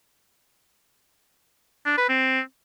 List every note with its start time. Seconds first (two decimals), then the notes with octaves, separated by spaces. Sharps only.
1.86 D4
1.97 B4
2.09 C4